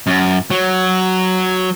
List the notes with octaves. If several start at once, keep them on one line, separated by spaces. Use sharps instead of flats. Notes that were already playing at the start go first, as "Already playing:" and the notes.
F#2
F#3